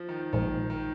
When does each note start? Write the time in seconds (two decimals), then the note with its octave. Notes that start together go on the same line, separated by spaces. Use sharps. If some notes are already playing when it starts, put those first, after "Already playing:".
Already playing: F3
0.09 D#3
0.33 A#1 A#2 D#3 F3 G#3
0.70 D#3